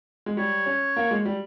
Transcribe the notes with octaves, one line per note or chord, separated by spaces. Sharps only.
G#3
G3 C#5
C#4
A#3
G#3
G3